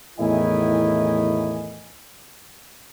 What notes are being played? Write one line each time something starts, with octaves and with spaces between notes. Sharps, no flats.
E2 A2 D#3 E4 D#5 G#5